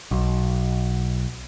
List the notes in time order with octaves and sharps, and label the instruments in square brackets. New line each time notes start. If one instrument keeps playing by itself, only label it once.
[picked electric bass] B1